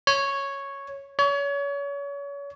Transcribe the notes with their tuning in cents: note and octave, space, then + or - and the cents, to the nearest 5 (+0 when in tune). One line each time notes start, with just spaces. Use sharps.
C#5 +0
C#5 +35